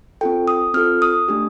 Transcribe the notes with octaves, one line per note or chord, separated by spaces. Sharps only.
C4 F4 A4 G5
D#6
C4 F4 A4 F6
D#6
A3 D4 G4